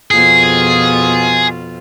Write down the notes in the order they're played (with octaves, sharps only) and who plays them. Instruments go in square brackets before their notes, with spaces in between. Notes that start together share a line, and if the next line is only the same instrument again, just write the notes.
[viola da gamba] F2 B2 F4 [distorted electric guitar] G#4